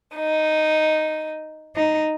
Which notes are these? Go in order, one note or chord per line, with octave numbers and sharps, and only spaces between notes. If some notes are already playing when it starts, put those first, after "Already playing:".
D#4
D#4